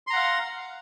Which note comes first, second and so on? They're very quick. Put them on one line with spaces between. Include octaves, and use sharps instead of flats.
C6 A#5 F#5 F5